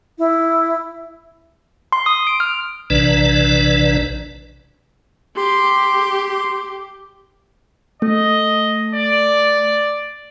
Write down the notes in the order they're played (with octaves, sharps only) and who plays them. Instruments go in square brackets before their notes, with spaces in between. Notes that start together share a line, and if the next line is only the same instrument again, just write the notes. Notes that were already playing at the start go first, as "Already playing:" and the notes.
[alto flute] E4
[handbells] C6
D#6
D7
F6
[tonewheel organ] A#1 C3 E3 D4 B4 D5
[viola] G4 [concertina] C6
[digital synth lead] A3 [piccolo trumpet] D#5
[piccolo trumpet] D5